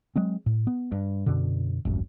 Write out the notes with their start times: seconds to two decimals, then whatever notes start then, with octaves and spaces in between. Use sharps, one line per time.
0.16 F#3 G#3 C4
0.46 A2
0.67 B3
0.92 G2
1.26 F#2 B2 D3
1.85 D1 G#1 F#2